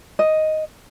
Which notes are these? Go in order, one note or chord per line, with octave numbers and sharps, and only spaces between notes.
D#5